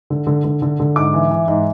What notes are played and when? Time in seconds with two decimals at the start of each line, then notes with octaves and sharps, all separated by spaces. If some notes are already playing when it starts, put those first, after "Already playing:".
0.10 D3
0.27 D3
0.44 D3
0.62 D3
0.80 D3
0.96 G#2 D6
1.14 E3
1.31 E3
1.48 G#2